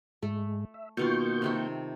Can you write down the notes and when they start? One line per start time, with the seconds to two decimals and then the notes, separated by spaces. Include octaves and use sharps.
0.22 G#2 G#3 A3
0.74 E5
0.97 B2 D#3 A#3 F4 C#6 G6
1.42 C3 D#3 A3